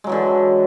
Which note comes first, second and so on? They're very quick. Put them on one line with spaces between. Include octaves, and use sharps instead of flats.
G#3 F#3 E3 D3